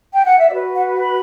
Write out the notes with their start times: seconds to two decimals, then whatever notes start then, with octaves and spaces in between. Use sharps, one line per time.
0.13 G5
0.25 F#5
0.37 E5
0.50 F#4 B4 D5
0.74 F#5
0.98 B5